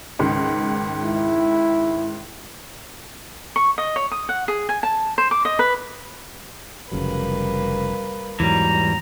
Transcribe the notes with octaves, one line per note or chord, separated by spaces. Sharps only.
C#2 G#2 D#3
E4
C#6
D#5
C#5
D#6
F#5
G#4
G#5
A5
C5
D6
D#5
B4
F1 C#3 F#3 G3 A#3 B4
E2 G#2 E3 F#3 G3 A#5